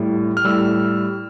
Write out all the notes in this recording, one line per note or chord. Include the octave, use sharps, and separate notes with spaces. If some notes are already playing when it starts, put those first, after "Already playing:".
Already playing: A2 G3
F6
A2 G3 E6